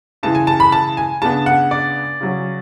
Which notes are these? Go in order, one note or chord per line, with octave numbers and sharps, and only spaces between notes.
C#3 E3 G#3 A5
G#5
A5
B5
A5
G#5
C#3 G#3 B3 D4 A5
F#5
D5
C#3 F#3 C#4